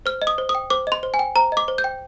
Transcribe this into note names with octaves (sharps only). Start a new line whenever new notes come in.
C5 F6
D#5
D#6
C5
D#6
G5
C5 D6
D#5 C6
C5
G#5
G5
C5 A#5
D#5 D6
C5
G6
G5